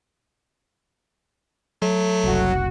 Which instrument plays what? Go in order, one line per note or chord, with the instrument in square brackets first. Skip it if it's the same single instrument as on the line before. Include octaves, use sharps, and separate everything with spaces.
[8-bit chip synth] F#3 [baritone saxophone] A3
[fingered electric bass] F#1 C2 [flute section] F#4